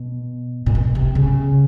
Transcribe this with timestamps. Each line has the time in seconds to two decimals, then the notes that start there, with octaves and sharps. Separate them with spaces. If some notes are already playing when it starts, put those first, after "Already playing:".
Already playing: B2
0.66 A#2
0.75 B2
0.95 C3
1.15 C#3